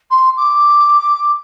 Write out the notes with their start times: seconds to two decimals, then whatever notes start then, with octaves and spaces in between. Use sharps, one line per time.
0.10 C6
0.37 D6